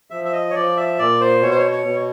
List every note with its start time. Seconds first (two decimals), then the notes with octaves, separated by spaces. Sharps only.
0.11 F3 E5
0.25 E5
0.33 D#5
0.50 C#5
0.55 F3 D5
0.77 E5
0.98 A#2 D5
1.21 C5
1.42 B2 C#5
1.51 C5
1.58 C#5
1.71 C#5
1.86 B2